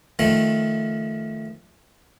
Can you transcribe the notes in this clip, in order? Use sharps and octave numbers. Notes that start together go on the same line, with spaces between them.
D#3 F3 A3